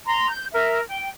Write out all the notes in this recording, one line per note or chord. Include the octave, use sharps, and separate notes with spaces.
A#5 C6
G6
A#4 E5
G5